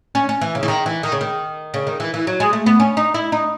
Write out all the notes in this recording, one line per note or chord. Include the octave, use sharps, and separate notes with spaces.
C#4
C#4
E3
C#3
E3
D#3
E3
D#3
C#3
D#3
C#3
D#3
E3
E3
F#3
G#3
A3
B3
C#4
D#4
E4
D#4